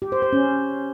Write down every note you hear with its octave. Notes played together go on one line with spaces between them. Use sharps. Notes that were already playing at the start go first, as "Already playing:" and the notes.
G4
C5
C5
C#4